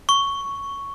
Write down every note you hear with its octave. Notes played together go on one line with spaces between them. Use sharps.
C#6